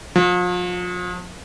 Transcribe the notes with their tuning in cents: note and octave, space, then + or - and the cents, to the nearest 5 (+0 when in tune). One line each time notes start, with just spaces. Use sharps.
F3 +35